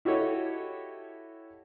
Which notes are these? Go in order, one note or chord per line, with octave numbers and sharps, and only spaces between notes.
E4 F#4 G4 A4 C#5 D#5